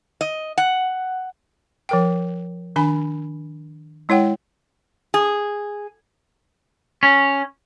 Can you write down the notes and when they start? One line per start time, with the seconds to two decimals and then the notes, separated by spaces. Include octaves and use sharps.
0.21 D#5
0.58 F#5
1.89 F3 A#4 G5
2.76 D#3 D4 G#5 B5
4.09 G#3 E4 C#5 F#5 G5
5.14 G#4
7.03 C#4